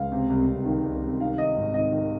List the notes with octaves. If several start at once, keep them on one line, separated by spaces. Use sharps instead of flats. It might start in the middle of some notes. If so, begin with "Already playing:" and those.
Already playing: C#2 F5
C3
C2
C2
D#3
C2
C2
D#3 F5
D#3 D#5
G#1
D#3 D#5
D#3